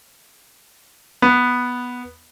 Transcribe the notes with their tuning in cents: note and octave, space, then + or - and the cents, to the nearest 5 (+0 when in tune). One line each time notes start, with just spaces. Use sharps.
B3 -5